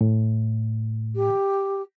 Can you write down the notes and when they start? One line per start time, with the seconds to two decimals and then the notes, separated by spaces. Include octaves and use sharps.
0.01 A2
1.15 G4